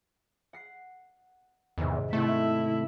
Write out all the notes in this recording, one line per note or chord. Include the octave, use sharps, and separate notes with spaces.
F#5 C7
E2 G#2 C3 D#3
C3 A3 B3 C4 E4